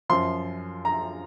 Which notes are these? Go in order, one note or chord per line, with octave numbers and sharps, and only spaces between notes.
F#2 F3 C6
A#5